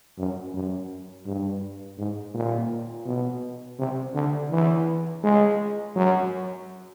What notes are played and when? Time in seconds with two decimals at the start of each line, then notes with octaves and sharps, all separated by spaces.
0.18 F#2
0.54 F#2
1.26 G2
1.98 G#2
2.35 A#2
3.06 B2
3.79 C3
4.14 D3
4.51 E3
5.24 G#3
5.96 F#3